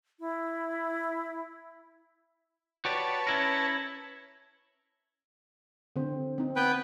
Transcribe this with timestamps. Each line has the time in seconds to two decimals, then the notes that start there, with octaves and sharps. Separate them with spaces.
0.20 E4
2.85 F#4 G4 B4 C#5 D5 A5
3.27 C#4 E4 A#4
5.96 D3 C4 C5
6.38 C4 D#4
6.56 B3 B4 G5